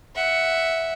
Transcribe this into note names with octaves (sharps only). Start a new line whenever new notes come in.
E5 F#5